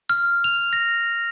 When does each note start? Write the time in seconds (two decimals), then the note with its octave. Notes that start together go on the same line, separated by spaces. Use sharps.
0.10 F6
0.44 F7
0.73 A#6